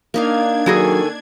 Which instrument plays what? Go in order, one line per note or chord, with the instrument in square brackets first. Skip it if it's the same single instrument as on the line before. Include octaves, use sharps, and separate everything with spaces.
[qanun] A#3 D#4 F5 [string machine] D4 G#6
[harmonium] D#3 A4 G#5 [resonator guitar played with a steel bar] F#3 F#4 G#4